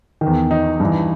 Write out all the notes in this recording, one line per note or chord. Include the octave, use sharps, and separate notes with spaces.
D#3
E2
D#4
G2
E3